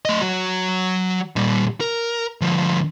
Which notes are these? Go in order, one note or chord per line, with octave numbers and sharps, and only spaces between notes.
A3 D#5
F#3 F#4
A#2 G3
A#4
D2 F3